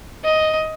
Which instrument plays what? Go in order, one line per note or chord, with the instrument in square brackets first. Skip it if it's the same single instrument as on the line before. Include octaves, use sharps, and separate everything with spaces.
[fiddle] D#5